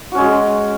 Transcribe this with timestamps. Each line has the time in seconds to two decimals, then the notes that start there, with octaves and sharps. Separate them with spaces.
0.12 F#4
0.15 C#4
0.18 G#3